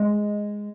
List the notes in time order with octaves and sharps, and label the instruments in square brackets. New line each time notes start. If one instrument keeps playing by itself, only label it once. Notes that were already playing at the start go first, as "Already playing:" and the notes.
Already playing: [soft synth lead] G#3